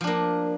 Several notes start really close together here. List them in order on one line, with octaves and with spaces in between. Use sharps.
F3 D4 A#3